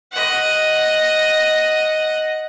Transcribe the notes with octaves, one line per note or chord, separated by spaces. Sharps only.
D#5 F#5